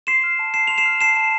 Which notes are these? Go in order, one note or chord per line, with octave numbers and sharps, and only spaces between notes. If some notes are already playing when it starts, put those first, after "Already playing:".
C6 C7 E7
F6
A5
A5 C7 E7
C6 F7
C7 E7
F6
A5 C7 E7
A5